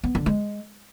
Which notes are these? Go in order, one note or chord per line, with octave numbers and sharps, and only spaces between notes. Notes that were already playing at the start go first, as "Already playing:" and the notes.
B3
D3
G#3